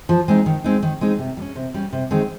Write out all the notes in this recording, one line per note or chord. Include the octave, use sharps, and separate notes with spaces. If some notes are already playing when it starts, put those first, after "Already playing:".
F3
G#3 C4 D#4
D#3
G#3 C4 D#4
D#3
G#3 C4 D#4
C3
G3
C#4
C3
G3 C#4
C3
D#3 G#3 C4 D#4